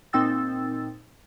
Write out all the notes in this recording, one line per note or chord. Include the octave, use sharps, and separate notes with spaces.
A#2 C4 D#4 G5 E6 A6